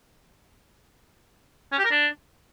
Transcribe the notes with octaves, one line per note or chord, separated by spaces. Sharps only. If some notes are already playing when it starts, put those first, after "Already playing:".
C#4
G4
A#4
D4